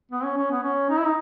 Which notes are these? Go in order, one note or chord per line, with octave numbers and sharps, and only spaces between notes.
B3
C#4
C#4
B3
C#4
D#4
E4
D#4